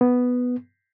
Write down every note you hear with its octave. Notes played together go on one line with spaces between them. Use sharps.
B3